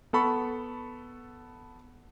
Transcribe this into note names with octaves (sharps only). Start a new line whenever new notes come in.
B3 A4 B5 C#6